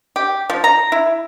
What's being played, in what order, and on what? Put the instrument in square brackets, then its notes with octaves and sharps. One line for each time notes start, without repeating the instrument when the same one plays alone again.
[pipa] G4
F3
A#5
E4